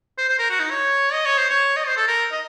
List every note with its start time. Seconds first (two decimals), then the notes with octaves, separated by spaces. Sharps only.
0.18 C5
0.29 C5
0.39 A#4
0.50 F#4
0.59 D#4
0.70 C#5
1.12 D#5
1.25 C#5
1.38 C5
1.50 C#5
1.76 D#5
1.87 C5
1.97 A4
2.07 A#4
2.31 D#5